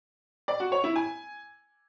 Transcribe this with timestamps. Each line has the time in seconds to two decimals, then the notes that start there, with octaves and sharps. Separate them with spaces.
0.48 D5
0.60 F#4
0.72 C#5
0.84 E4
0.96 G#5